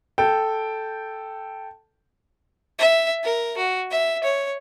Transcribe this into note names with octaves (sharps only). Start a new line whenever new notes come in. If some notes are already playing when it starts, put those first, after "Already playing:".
A4 G5
E5
A#4
F#4
E5
C#5